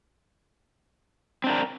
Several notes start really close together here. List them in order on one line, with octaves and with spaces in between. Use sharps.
C4 D4 A#4